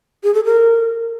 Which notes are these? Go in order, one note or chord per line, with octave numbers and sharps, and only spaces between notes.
G#4
A4
A#4